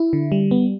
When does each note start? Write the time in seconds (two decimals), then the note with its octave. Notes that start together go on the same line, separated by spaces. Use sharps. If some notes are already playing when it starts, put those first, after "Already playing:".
Already playing: E4
0.13 D3
0.32 G3
0.51 B3